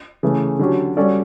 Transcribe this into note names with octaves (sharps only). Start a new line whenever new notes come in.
C#3 E3 A3
D3 F#3 C#4 G4
G3 C#4 F#4 A4 D5